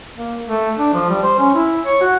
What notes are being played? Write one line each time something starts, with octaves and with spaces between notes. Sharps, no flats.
A#3
A3
D4
F3
G3
C5
C#4
E4
C#5
F#4